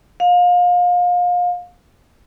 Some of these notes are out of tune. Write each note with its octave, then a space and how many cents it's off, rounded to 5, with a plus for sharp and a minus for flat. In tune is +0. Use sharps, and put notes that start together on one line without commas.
F5 +30